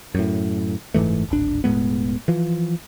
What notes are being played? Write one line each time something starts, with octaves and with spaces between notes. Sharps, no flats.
F#2 A2
F#1 G#2 E3 A3
D1 G#1 D4
E1 A2 G#3 B3
E3 F3